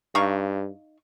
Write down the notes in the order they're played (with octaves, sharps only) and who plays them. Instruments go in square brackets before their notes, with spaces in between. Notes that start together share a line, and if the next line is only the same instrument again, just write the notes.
[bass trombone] G2 [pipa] D#4 F5 C#6